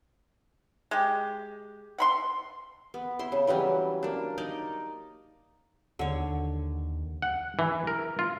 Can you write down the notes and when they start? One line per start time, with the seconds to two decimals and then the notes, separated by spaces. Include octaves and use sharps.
0.91 G#3 G4
1.98 F#5 B5 C6
2.94 B3
3.19 E4 C6
3.32 C#3
3.47 E3 F#3 G3 C#4
4.03 A#3 D4
4.38 D#4 A#4 D5 D#5
5.99 D#2 D3 C#5
7.22 F#5
7.59 E3
7.87 A#4
8.19 F4